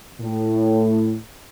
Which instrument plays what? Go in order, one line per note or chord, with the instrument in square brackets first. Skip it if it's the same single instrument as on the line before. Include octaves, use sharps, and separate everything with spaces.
[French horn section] A2